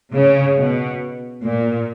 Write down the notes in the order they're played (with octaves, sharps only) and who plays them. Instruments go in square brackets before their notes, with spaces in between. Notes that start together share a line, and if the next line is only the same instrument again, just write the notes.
[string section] C#3
B2
A#2